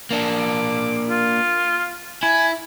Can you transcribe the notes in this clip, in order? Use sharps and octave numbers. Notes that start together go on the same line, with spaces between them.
A#3 D4
D6
F4
E4 G#5